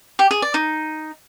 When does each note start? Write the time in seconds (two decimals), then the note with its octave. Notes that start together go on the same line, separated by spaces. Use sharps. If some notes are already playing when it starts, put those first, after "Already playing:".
0.19 G4
0.31 G#4
0.42 D5
0.54 D#4